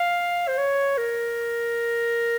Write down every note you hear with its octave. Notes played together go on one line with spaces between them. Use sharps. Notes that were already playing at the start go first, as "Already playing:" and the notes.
Already playing: F5
C5
C#5
A#4